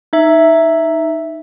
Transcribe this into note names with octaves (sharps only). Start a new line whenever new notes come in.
D#4 E5